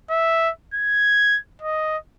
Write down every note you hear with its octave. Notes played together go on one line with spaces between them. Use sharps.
E5
G#6
D#5